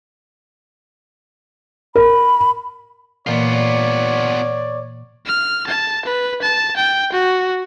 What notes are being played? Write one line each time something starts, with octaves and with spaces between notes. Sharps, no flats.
A#4 B5
A#2 E3 A#3 B3 F4 C#5 D5
F6
A5
B4
A5
G5
F#4